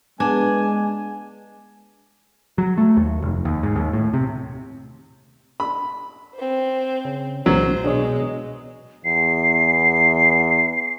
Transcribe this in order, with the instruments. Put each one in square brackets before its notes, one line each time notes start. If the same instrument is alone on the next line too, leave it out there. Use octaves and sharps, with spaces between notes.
[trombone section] G#3 [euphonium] B3 [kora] D4 [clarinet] G#5
[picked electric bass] F#3
A3
D#2
F1
D#2
G#2
D#2
A2
C3
[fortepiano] B5
[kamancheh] C4 C5
[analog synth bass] C#3
[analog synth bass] C2 [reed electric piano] A#2 E3 [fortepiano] F#3 [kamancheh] C5
[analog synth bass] B2 [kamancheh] G#3 [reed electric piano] D4 C#5
[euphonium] E2 [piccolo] C7